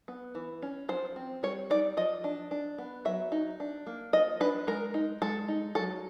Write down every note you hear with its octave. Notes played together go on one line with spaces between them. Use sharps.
B3
E3
C#4
F3 C5
C4
G3 C#5
D#4 D5
F3 D#5
D4
D4
B3
F#3 E5
D#4
D4
A#3
F3 D#5
D4 B4
G#3 A#4
D#4
G#3 A4
D#4
F#3 A4